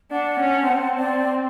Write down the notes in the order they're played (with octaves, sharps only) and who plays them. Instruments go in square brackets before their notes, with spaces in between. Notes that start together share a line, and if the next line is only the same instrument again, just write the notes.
[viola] D4 [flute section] F#5
[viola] C#4
[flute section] A5
[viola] C4
[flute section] D5